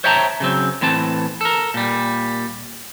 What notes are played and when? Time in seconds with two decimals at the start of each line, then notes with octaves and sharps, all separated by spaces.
0.04 C5 C#5 E5 G5 A5 A#5
0.40 C#3 F#3 C4
0.81 A2 E3 C4 A5
1.41 A4 A#4
1.74 A#2 G3